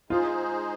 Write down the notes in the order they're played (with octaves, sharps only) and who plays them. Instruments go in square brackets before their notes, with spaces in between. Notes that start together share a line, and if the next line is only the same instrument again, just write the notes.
[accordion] G#3 D#4 G#4 C5 [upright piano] F4